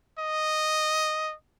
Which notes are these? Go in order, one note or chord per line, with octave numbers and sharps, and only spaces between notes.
D#5